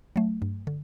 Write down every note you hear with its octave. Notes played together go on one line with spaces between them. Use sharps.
F#3 A3
G2
D3